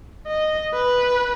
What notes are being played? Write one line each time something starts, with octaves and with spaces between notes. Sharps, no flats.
D#5
B4